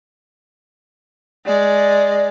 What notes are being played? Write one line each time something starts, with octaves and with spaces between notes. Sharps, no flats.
G#3 D5